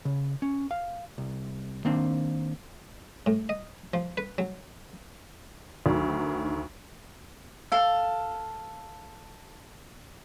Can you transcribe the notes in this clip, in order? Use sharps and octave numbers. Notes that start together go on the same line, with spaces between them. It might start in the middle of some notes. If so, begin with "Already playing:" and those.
C#3
C#4
F5
C2
D#3 A#3 C4 D4
A2
D#5
F3
B4
F#3
D2 D#3 F#3
A4 F5